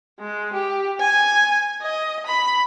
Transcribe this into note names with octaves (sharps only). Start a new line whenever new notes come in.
G#3
G4
G#5
D#5
B5